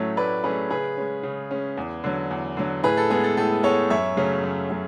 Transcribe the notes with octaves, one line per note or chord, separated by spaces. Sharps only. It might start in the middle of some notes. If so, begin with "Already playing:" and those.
Already playing: A2 F#3 A3 C#4 C#5
A2 B4 D5
F#3 A3 C#4 G#4 B4
C#3 G#4 B4
G#3 C#4
C#3
G#3 C#4
E2
D3 F#3
E2
D3 F#3
A2 G#4 B4
A4
G#3 B3 G#4
A4
A2 A4
G#3 B3 A4 C#5
F#2 C#5 E5
C#3 F#3 A3 C#4
F#2
C#3 F#3